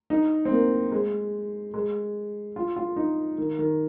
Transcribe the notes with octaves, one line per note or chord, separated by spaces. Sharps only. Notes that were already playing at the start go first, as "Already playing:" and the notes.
D#4
C4
A#3
G#3
G#3
F4
F4
D#4
D#3
D#3